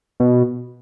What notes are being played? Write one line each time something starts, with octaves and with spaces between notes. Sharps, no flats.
B2